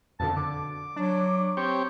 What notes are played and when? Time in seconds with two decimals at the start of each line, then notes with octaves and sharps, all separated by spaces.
0.20 F2 B2 D3 A5
0.37 D3 D6
0.96 F#3 D4
1.57 C4 G4 C#5